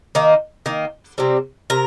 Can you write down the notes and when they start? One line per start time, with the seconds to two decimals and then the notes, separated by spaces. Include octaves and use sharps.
0.15 D#3 A#3
0.66 D#3 A#3
1.18 C3 G3 C4
1.70 C3 A#4